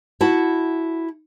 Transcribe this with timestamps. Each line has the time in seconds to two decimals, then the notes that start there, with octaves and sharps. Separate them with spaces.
0.21 E4 F#4 A5